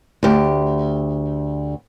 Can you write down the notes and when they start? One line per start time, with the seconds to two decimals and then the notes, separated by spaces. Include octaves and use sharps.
0.23 D2 G4